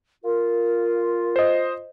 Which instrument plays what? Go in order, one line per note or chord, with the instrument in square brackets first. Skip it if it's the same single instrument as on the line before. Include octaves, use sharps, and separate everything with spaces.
[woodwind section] F4 [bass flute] A#4
[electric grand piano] C5 D#5